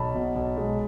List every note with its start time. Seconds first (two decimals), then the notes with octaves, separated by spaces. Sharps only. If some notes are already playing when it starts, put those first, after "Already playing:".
Already playing: B1 A5 B5
0.15 B2
0.36 B1
0.57 G#3